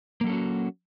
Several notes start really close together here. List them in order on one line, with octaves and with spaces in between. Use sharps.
A#3 F#3 A4 C#4 F#4